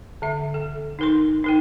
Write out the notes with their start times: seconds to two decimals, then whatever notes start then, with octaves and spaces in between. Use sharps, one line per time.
0.22 D3 E5
0.54 A4
0.99 D#4 A#4 C6
1.44 D#4 A#4 G5